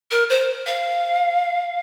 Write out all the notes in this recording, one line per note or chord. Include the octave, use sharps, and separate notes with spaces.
A#4
C5
F5